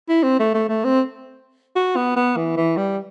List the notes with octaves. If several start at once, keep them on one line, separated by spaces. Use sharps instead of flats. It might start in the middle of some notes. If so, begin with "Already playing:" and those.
E4
C4
A3
A3
A3
C4
F#4
B3
B3
E3
E3
G3